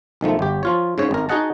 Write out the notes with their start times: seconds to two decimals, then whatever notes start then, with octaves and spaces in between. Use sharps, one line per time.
0.21 B1 D#3 F3 A3
0.39 G1 G4
0.63 F3 F4 C#5
0.98 G#2 C#3 C#5
1.11 G#1 A#4
1.29 D#4 F#4 G#4 D#5 F#5 A5